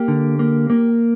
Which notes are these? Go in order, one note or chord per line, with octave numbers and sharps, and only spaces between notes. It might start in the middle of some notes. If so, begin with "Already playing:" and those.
Already playing: A#3 G4
D3
A#3
A#3